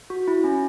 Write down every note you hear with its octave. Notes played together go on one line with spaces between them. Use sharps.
F#4
E4
C#4